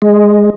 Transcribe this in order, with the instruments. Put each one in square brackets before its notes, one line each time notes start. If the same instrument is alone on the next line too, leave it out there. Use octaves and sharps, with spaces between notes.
[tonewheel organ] G#3